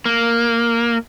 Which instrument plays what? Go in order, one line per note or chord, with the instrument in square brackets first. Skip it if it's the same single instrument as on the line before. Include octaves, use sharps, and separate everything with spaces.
[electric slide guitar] A#3